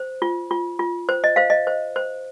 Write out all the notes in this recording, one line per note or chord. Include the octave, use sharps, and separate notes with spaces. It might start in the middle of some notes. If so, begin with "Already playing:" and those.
Already playing: C5
F4
F4
F4
C5
D#5
C5 F5
D#5
C5
C5